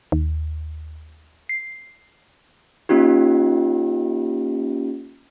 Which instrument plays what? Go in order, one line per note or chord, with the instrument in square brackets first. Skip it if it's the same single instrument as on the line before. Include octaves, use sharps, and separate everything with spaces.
[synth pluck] D#2
C7
[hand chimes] A#3 C#4 D#4 F4 G4